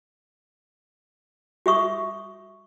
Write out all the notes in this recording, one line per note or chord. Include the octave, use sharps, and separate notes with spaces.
F#4 E5 C#6 D#6